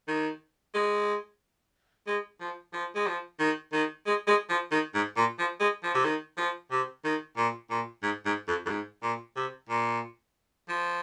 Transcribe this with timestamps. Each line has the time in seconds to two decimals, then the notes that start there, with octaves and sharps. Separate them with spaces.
0.08 D#3
0.74 G#3
2.07 G#3
2.40 F3
2.73 F3
2.95 G#3
3.06 F3
3.39 D#3
3.73 D#3
4.06 G#3
4.27 G#3
4.49 F3
4.72 D#3
4.94 G#2
5.17 A#2
5.39 F3
5.60 G#3
5.83 F3
5.94 C3
6.04 D#3
6.37 F3
6.71 C3
7.04 D#3
7.37 A#2
7.70 A#2
8.03 G#2
8.26 G#2
8.47 F2
8.66 F2
8.69 G#2
9.02 A#2
9.36 C3
9.69 A#2
10.69 F3